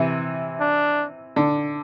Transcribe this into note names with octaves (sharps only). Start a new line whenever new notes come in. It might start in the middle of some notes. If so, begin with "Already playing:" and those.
Already playing: C3 E3
D4
D3